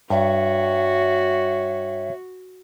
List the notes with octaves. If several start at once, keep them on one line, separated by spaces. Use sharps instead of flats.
G2 F#4 C#5 E5